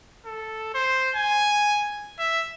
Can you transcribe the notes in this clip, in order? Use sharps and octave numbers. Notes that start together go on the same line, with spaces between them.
A4
C5
G#5
E5